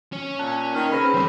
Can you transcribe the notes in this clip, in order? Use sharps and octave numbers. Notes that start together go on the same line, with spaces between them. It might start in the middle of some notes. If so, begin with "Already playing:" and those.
C#4 C#5
A#2 A5 F#6
D#3 F6
C#3 B3 C4 B5 F6 A#6
E2 G2 G3 C5